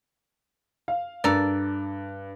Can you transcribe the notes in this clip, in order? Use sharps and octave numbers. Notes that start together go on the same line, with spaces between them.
F5
G2 A4 A#4 D5